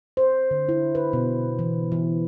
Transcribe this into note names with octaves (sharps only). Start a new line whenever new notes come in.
C5
D3
E4
B4
B2
E3
E3